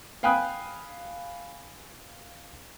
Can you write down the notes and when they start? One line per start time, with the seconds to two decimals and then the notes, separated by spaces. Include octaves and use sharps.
0.23 F5 G5 G#5 B5 D#6 F#6